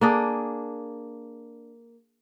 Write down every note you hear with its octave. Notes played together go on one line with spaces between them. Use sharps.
A#3 D4 G#4